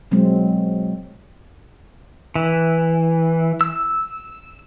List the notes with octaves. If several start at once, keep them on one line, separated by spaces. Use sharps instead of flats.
B2 F#3 G#3 C4
E3
E6